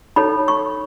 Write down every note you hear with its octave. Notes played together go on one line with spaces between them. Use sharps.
D#4 A4 C#5 B5
C#6